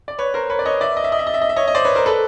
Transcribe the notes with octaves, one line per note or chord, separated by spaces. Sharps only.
D5
B4 C#5
A#4 C5
B4 C#5
D5
C#5 D#5
D5 E5
D#5
E5
D#5
E5
D#5
E5
D#5
E5
C#5 D#5
D#5
C5 D5
B4 C#5
A#4 C5
A4 B4